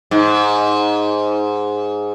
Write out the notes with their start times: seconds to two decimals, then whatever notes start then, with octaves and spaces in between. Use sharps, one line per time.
0.11 G#2